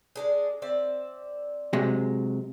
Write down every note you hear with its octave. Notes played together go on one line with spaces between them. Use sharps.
G#3 D4 G#4
C4 D5 E5
C3 F#3 G#3